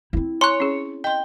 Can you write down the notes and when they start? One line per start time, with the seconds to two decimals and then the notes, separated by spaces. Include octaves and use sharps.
0.13 C4 E4
0.41 C#5 G#5 A#5 C6 C#6 F#6
0.60 C#4 G#4
1.04 D#5 G5 C6